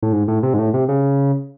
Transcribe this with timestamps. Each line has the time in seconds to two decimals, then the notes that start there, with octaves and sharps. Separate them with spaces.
0.03 A2
0.13 G#2
0.28 A2
0.43 C3
0.54 G#2
0.59 A2
0.74 C3
0.89 C#3